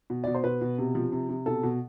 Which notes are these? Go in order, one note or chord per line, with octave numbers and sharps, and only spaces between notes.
B2
B2 D5
C5
B2 B4
B2
C3
F3
C3
C3
B2 A4
B2